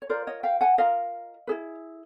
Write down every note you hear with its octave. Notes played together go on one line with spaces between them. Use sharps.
C#5
F4 A#4 C5 D5
C#5 D#5
F5 G5
F#5 G#5
F4 A#4 D#5 F5
E4 G#4 B4